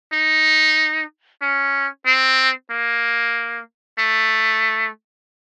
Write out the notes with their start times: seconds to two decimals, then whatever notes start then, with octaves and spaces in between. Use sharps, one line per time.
0.13 D#4
1.42 C#4
2.06 C4
2.71 A#3
3.99 A3